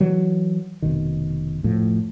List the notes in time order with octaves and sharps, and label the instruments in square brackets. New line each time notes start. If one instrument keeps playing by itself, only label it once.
[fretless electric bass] E3 F#3
F1 B2 D#3
F1 A2 F3